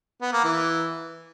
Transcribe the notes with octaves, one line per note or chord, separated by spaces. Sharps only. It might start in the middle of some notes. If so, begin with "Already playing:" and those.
B3
A#3
E3